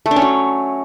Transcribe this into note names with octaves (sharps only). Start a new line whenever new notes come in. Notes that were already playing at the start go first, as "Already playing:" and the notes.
A3
D4
C#4
F#3